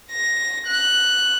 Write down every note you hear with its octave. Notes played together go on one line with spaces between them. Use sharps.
A#6
F#6